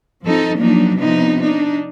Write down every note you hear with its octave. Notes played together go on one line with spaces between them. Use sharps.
F3 C4 D#4 A4
F3 F#3 A#3 D4 D#4
C3 F3 B3 D4 D#4
D4 D#4